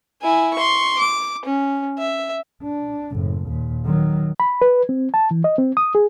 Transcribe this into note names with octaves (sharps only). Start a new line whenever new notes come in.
E4 G#5
C6 C#6
D6
C#4
E5
D4
F#1 A2
D#2 A#2
D#3 F#3
B5
B4
C4
A5
E3
D#5
C4
D#6
G#4